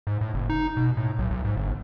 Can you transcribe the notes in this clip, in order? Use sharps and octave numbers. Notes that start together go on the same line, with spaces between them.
G#2
A2
F#1
D#4
B2
A2
B1
B1
G#2
G1